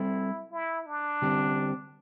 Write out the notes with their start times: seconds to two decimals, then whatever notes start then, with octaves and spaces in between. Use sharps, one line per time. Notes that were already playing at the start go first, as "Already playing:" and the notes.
Already playing: G3 C4 E4 A4
0.52 E4
0.87 D4
1.22 D3 G3 C4 G4